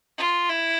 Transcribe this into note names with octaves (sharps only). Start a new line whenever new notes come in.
F4
E4